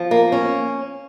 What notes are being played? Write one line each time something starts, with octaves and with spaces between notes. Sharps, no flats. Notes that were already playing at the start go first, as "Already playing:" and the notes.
Already playing: F3
A#3
C#4